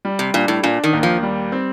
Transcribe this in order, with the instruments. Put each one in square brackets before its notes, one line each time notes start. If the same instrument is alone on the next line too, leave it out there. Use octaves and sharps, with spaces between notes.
[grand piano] G3
[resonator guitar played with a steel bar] C3
[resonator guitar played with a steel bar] A#2 [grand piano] D4
[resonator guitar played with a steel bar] A2
[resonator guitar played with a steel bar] A#2 [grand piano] D4
[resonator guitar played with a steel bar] D#3
[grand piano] D#2
[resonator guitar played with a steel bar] F3
[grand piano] G3
C4